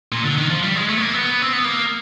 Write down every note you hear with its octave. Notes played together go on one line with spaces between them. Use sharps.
A#2
D3
D#3
F3
G3
G#3
A3
B3
A#3
B3
C4
B3
A#3